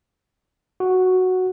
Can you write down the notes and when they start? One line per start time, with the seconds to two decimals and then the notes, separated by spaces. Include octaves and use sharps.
0.80 F#4